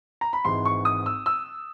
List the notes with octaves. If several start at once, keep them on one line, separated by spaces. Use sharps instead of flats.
A#5
B5
G#1 G#2 E3 C6
C#6
D#6
E6
E6